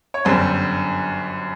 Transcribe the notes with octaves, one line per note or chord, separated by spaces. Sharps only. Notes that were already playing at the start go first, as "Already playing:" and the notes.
C#5
G1 F#2 D3 G3 C5